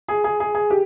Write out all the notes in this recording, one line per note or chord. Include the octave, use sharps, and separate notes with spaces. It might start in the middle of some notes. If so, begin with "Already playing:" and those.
G#4
G#4
G#4
G#4
G4